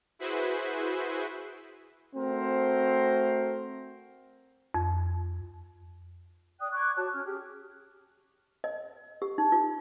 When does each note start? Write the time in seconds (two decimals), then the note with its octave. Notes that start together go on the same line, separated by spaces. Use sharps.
0.19 E4 F#4 G#4 B4 C5 E5
2.15 A3 C4 F#4 A#4 C5
4.74 F2
6.60 D5 G5 D#6 F#6
6.72 C#6 D6 F#6 G#6
6.96 F#4 C#5 A5 F#6
7.12 C#4 F6
7.24 G4 G#4
8.64 D#5
9.22 G4
9.38 D#4
9.52 F4